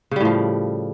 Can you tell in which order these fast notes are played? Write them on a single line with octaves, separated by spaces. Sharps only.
C#3 G3 A2 F3